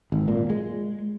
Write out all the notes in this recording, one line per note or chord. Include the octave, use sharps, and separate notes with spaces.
G#1
A#2
G#3